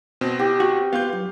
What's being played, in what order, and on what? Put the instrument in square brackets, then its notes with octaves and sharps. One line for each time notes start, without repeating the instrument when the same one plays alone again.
[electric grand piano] B2 C4
[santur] G4
[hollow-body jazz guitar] F#4
[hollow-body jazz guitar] B3 F4 [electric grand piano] F5 G6
[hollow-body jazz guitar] F#2